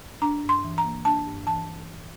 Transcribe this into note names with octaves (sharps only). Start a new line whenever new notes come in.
D4 A#5
G2
C6
E3
A#5
A#3
D4 A5
G2
E3 A5